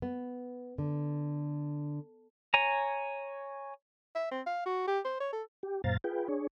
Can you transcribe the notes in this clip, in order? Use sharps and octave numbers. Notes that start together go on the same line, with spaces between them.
B3
D3
C#5 G#5 A#5
E5
C4
F5
F#4
G4
C5
C#5
A4
G4
F#2 A#2 C5 F5 A#5 A6
F4 G#4 B4 G5
D4 G#4 C#5